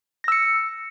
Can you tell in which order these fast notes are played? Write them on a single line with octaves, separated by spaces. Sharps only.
A#6 E6 C#7